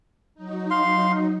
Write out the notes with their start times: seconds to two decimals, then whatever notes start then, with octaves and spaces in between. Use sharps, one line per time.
0.35 F#3 D#4
0.70 F5 C6